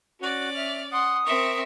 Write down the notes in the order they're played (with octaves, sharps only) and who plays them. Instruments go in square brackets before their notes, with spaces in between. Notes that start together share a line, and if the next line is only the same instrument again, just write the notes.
[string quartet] C#4 D5 [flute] F#4
[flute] E5 [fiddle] F6
[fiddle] F#5 C6 [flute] D#6
[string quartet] C4 E5 [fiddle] A#4 C#6